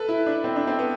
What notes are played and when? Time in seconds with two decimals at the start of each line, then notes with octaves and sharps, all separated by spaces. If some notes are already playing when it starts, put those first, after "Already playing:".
Already playing: A4 B4
0.09 E4
0.26 D4
0.44 C4
0.56 D4
0.67 C4
0.79 B3